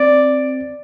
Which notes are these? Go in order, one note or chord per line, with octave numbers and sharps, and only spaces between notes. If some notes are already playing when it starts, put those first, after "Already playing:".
Already playing: C4 D5